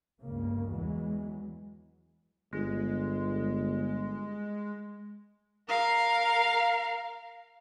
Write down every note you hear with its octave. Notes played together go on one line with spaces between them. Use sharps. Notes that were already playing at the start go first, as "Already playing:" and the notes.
G1 C#2 G2 C#3 A#3
E2 E3 F#3 G#3
G1 G#3
A#4 F5